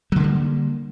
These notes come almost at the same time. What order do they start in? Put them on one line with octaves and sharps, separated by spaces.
F#3 D3 A#3 G3